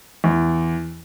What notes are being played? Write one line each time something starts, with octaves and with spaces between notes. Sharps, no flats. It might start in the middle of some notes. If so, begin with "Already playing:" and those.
E2